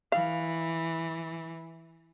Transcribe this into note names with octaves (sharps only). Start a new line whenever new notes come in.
E3 F5